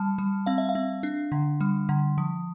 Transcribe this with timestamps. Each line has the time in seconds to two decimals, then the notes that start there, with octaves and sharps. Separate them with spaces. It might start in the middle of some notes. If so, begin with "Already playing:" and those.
Already playing: G3 A5
0.18 G3
0.46 C4 F5
0.58 E5
0.69 F5
0.75 C4
1.03 D4
1.32 D3
1.61 G3
1.89 D3
2.18 F3